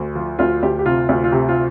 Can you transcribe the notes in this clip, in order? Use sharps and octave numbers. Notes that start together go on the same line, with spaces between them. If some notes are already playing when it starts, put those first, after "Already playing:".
Already playing: D2
F3 F4
D2 F4
D2 G4
G4
C3 F4
D2 F4
F4
C3 G4
F4